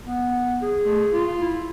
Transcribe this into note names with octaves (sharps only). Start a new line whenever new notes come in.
B3
G#4
A3
F4
E4